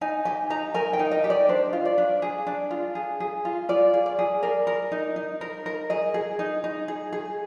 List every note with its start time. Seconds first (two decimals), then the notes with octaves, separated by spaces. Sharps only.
0.01 D#4 G#5
0.25 G4 G#5
0.50 D#4 A#5
0.74 A#4 G#5
0.93 G5
0.99 D#4
1.12 D#5
1.24 G4
1.30 D5
1.49 D4 C5
1.73 F4
1.85 D5
1.98 D4
2.22 G#4
2.47 D4
2.71 F4
2.95 G#4
3.20 G#4
3.45 F4
3.69 F4 D5
3.94 G#4
4.06 D5
4.19 G#4
4.43 A#4 D5
4.67 A#4
4.92 D#4
5.16 D#4
5.41 A#4
5.66 A#4
5.90 G#4 D#5
6.14 G#4
6.39 D#4
6.64 D#4
6.88 G#4
7.13 G#4